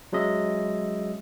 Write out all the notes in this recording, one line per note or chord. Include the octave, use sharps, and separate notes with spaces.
F#3 G#3 C#4 D#5 E5